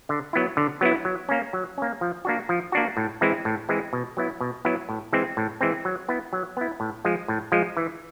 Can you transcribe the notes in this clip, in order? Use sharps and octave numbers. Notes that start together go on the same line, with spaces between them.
D3
F#3 B3 E4
D3
F#3 B3 E4
F#3
A#3 C#4
F#3
A#3 C#4
F3
A#3 D4 F#4
F3
A#3 D4 F#4
A2
E3 G#3 C4 E4
A2
E3 G#3 C4 E4
B2
F#3 B3 E4
B2
F#3 B3 E4
A2
E3 G#3 C4
A2
E3 G#3 C4
F#3
B3 E4
F#3
B3 E4
A2
F3 G#3
A2
F3 G#3
E3